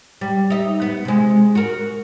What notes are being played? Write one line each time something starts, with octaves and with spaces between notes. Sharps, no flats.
G3
D#4 E5
B3
C3 G#3
F#4 A#4